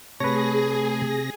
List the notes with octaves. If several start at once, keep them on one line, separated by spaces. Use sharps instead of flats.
C3 A3 G#4 B4 C#5 A#6